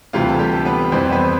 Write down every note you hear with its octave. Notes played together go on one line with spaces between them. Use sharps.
D2 C3 E3 G3 F4
A4
G3 G4
A4
B3 B4
F2 E3 G3 C4 C5
B3 B4